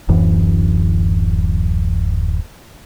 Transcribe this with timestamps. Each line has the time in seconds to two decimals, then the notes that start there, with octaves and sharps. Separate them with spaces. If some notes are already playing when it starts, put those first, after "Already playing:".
0.09 D1 F#2 E3